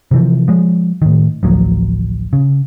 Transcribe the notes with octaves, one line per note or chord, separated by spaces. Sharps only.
C3 E3 F3
F3 G#3
A2 D#3
A1 D2 F3 F#3
C#3